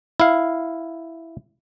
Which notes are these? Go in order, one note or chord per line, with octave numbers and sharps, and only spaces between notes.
E4 F5